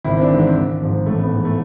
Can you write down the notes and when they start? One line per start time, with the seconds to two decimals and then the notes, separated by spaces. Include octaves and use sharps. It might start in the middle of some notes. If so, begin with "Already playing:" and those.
0.04 G#1 E4
0.17 C4
0.21 D4
0.30 G#2 E3
0.39 C4
0.56 G#1
0.81 G#2 F3
1.06 A1 A3
1.20 B3
1.32 G#2 E3
1.45 A3